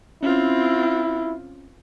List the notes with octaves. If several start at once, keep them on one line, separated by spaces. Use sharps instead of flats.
C4 C#4 E4 F4